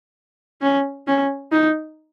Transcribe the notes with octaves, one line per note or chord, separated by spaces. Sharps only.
C#4
C#4
D#4